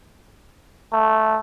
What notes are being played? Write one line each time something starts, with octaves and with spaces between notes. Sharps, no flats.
A3